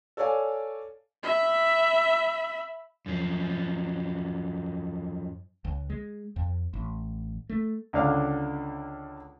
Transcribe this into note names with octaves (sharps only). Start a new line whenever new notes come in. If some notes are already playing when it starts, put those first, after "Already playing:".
A4 C#5 D5 F5 G#5
E5 B5
F#2 F3
C#2
G#3
F2
A1
A3
C#2 D3 D4 F5